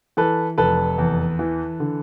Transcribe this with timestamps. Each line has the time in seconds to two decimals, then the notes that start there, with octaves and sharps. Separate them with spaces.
0.17 E3 A4 B4
0.58 F1 A4 B4
0.98 E2
1.39 E3
1.80 D3